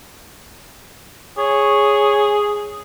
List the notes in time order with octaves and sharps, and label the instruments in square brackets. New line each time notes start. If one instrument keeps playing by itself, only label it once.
[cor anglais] G#4 [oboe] C#5